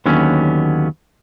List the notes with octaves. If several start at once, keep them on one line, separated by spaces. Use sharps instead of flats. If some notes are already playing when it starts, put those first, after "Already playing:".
D#2 D3 F#3 B3 C#4